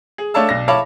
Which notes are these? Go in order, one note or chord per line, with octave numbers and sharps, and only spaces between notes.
G#4
A3 D4 C#5 F5 A5 E6
B1 D4 A#6
E4 C#5 F5 A5 B5 D6